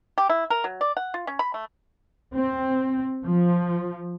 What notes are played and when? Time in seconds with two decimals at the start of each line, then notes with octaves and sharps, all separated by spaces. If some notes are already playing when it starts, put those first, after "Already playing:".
0.18 G4
0.29 E4
0.50 A#4
0.64 F#3
0.81 D5
0.97 F#5
1.14 F4
1.27 C#4
1.39 B5
1.54 A3
2.35 C4
3.25 F3